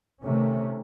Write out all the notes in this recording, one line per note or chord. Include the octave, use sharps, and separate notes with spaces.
C3 D#3 A3 C#4